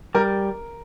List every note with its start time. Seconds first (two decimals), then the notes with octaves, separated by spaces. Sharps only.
0.15 G3 A#4